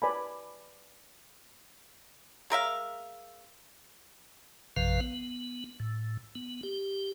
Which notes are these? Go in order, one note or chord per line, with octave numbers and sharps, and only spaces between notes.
B4 D5 G#5 A5 B5
G#3 A#4 E5 F5
A#1 F#2 C3 F3 B4 F5
B3
A2
B3
G4